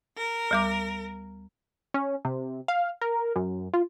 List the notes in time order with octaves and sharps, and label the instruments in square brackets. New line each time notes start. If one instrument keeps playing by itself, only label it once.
[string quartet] A#4
[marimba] D2 G3 D6
[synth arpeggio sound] C#4
C3
F5
A#4
F#2
F4